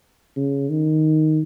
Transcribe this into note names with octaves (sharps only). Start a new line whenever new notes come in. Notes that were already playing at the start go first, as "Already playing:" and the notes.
C#3
D#3